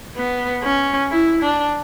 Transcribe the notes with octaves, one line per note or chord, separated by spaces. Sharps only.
B3
C#4
E4
D4